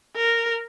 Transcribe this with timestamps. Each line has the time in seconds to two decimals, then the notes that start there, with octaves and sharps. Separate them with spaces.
0.16 A#4